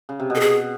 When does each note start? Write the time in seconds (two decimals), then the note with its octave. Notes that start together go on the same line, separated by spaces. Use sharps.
0.09 C#3
0.19 C3
0.30 B2
0.35 A4
0.40 G#4